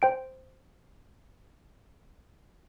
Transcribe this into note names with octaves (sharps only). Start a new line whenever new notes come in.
C5 G5 D7